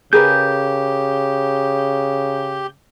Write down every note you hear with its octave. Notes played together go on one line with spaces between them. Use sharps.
C#3 G4 G#4 A#4 B4 G6